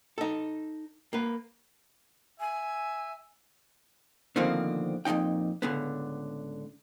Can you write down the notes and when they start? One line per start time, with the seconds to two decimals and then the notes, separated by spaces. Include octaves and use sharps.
0.18 D#4 A4
1.13 A#3 B4
2.40 E5 G#5
4.36 B2 D3 D#3 F3 A#3 C4
5.05 F2 A#2 C#3 D#4 G5
5.62 C#2 A2 D3 B3